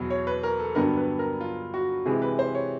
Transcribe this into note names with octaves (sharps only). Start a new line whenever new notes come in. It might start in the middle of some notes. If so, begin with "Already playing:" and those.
Already playing: E2 B2 F#3 B3
C#5
B4
A#4
A4
G2 D3 F#3 B3 A#4
B4
A#4
F4
F#4
C3 E3 G#3 G#4
B4
C5
C#5